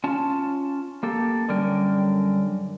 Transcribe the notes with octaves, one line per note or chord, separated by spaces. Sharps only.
C#4 F4 A5
A#3 G4 A4
F#2 D3 G3 C#4 A#4 G5